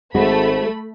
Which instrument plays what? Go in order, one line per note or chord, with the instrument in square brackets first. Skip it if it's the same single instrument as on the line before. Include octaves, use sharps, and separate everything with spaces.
[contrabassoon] G#1 [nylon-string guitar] G#3 F#4 [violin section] A3 B5 [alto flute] C5